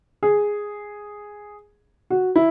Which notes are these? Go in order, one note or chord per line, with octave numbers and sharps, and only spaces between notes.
G#4
F#4
E4